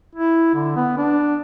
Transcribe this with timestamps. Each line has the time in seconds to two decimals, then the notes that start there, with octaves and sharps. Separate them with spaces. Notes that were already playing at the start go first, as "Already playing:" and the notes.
0.15 E4
0.54 D3
0.76 B3
0.97 D4